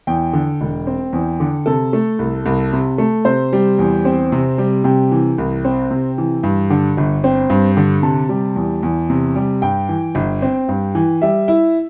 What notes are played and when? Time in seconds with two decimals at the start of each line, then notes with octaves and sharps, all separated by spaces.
0.07 E2 G5
0.33 D3
0.61 E1
0.87 C4
1.13 E2
1.40 D3
1.66 C3 A4
1.93 A3
2.19 C2
2.46 C2
2.73 C3
2.98 A3
3.25 C3 C5
3.53 G3
3.79 E2
4.05 C4
4.32 C3
4.58 G3
4.84 C3 G5
5.12 E3
5.38 C2
5.65 C4
5.91 C3
6.18 E3
6.43 G2
6.70 D3
6.97 G1
7.24 C4
7.50 G2
7.77 D3
8.03 C3 A5
8.29 G3
8.56 E2
8.83 E2
9.10 C3
9.35 G3
9.62 G2 G5
9.89 E3
10.15 G1
10.42 C4
10.69 G2
10.95 E3
11.22 G3 E5
11.48 E4